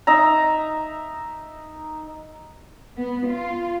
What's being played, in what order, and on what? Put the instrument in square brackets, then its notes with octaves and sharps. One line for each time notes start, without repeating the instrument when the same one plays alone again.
[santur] D#4 E5 A#5
[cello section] B3
F4